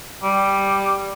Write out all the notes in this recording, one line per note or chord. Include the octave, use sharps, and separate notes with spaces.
G3